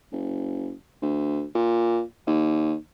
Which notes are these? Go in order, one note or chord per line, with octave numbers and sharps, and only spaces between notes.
F#1
D2
A#2
D#2